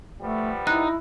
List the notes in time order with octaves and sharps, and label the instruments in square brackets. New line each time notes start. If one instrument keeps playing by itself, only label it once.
[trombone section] F3 G3 B3 [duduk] A3
[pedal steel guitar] D#4 [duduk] E4 [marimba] F#6